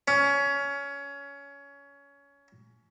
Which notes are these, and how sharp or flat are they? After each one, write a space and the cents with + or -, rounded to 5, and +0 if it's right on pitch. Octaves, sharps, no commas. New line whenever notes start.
C#4 +20